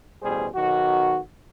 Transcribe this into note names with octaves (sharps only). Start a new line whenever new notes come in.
A1 B2 G3 G#4 C5
B1 D#3 F#4